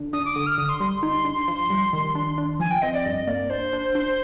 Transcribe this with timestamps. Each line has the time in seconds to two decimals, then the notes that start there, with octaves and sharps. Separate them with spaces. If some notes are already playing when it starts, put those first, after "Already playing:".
Already playing: D3 D4
0.13 D4 D#6
0.25 D6
0.35 D3 D#6
0.47 F6
0.58 D3 D#6
0.69 C6
0.80 G3 C6
1.03 D#4
1.25 D4
1.48 F3
1.70 G3
1.93 D#3
2.15 D4
2.38 D4
2.60 F3 G#5
2.71 G5
2.82 C4 D#5
2.94 D5
3.05 G2 D#5
3.27 A#3 D5
3.50 D4 C5
3.73 D4
3.95 D4